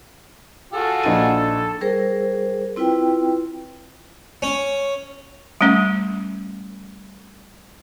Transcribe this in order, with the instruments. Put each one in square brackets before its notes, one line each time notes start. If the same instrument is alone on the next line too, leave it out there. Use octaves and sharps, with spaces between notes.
[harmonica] F4 F#4 G#4 [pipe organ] A4
[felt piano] A#1 D#4 D#7
[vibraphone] G3 G#4 A#4 C5
C4 E4 F4 B4 G5
[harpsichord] C#4
[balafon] G3 A3 C#4